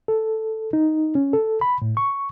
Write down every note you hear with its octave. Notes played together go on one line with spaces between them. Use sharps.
A4
D#4
C#4
A4
B5
A2
C#6